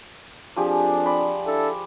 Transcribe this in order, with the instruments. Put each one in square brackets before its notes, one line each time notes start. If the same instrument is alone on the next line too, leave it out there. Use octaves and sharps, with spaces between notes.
[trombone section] F2 D4 [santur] F3 G4 G#4
[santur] D5 B5
[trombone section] D4 E4 A4